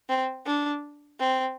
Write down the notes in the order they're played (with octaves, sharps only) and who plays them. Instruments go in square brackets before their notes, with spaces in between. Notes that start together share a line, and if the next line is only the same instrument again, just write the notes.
[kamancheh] C4
D4
C4